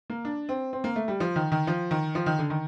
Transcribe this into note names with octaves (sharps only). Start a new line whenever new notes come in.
A#3
D4
C4
C4
A#3
A3
G3
F3
D#3
D#3
F3
D#3
F3
D#3
D3
D#3